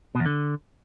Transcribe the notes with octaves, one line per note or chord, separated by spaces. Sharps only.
B2
E2
D3